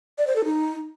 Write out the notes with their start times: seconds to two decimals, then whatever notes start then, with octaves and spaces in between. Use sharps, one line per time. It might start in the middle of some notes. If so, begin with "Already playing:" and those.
0.18 D5
0.27 C5
0.36 A4
0.45 D#4